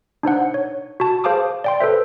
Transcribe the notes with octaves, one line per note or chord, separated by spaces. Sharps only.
D4 D#4 C5 F#5
C#5
F#4 A5
G#4 C5 F5 A5 D6 D#6
D5 G5 C6
A4 B4 C5 E5